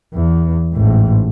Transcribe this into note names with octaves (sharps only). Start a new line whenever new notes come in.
E2
A1 G#2